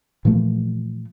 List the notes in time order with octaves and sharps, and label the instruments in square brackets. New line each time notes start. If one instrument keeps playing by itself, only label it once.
[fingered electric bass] A#2 E3 F3 A3